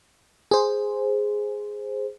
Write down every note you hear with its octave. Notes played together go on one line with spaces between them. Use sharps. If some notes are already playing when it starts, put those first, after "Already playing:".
G#4 C5